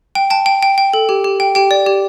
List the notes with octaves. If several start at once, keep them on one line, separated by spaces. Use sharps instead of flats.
G5
G5 A5
G5
G5
G5
A4
G4
G4
G5
G4 G5
D5
G4